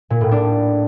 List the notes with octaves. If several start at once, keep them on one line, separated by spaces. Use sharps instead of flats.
A#2
A2
D4